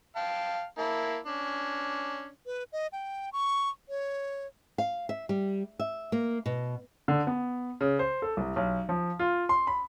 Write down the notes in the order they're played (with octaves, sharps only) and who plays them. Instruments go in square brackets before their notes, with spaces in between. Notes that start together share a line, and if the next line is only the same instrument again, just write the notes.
[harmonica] F5 G5 A5
A#3 E4 A5
C#4 D4
[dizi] B4
D#5
G5
C#6
C#5
[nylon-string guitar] F5
E5
G3
E5
A#3
B2
[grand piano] D3
B3
C#3
C5
A4
C2
B1
F3
F4
C6
B5